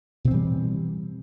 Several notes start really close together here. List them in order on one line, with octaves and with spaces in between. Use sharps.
B2 C4 E3 G3